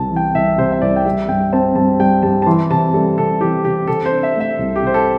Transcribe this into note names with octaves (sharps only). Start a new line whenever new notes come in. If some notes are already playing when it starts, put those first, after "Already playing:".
Already playing: C2 C3 A5
E3
G5
C2 E5
C3 C5
E5
C2 D5
G5
G3 E5
G2 G5
C4 A5
G2 A5
G3 G5
G2 A5
A5
E3 C6
C3 A5
G3 A4
C3 A4
E3 G4
C3 G4
C3 A4
C5
D4
E5
A3 E5
C2
G4
C3 C5
A4